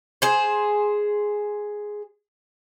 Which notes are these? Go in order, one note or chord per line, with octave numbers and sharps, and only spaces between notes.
G#4 C5